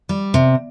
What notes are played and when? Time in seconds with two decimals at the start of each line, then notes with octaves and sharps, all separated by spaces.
0.09 G3
0.34 C3